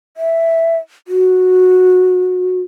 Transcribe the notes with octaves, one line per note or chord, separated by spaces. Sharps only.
E5
F#4